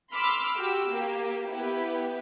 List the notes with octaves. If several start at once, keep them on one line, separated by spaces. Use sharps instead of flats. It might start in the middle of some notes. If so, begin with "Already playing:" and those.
B5 C6 D6 E6 F6
F#4 G4 E6
A#3 G4
B3 E4 G4 B4